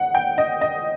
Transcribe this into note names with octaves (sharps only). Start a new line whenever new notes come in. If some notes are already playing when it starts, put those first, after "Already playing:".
Already playing: F#5
G5
D#5
D#5